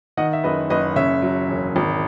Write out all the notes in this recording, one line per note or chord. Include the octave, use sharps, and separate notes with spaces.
D#3 D#5 F#5
E5
F#1 B4 D#5
F#1 B4 D#5
C#3 C#5 E5
F#3
E1
G#1